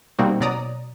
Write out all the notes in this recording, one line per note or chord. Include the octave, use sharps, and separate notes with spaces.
B2 G3 A#3 C4 D#4 F#4
B2 F#3 D5 A#5 D#6